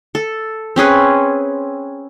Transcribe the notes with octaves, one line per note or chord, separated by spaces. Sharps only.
A4
C4 C#4 G#4 B4